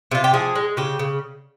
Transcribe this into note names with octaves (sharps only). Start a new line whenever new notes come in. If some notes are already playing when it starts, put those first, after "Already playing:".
C3 F4
G4
F3 G#4
G#3
C#3 G4
C#3